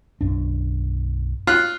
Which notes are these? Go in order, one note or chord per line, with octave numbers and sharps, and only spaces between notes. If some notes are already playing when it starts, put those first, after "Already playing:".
B1 F#2 D4
F4 F#6